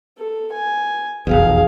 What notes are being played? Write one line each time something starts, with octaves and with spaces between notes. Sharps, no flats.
A4
G#5
F1 B1 E2 G#4 F5